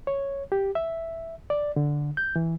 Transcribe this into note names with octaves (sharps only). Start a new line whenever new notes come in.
C#5
G4
E5
D5
D3
G6
E3